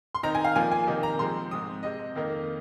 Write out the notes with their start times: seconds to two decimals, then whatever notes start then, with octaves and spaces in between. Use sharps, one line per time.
0.15 C6
0.23 D#3 C4 D#4 A#5
0.35 G#5
0.44 F5
0.55 A#2 F3 A#3 F4 G#5
0.71 G#5
0.87 C3 D#3 A#3 D#4
1.03 A#5
1.19 C3 F3 G#3 C4 C6
1.51 G#2 G#3 C4 D#6
1.83 C3 G#3 C4 D#5
2.15 F2 D#3 A#3 D#4